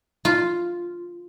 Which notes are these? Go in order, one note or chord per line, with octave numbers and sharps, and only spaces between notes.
F4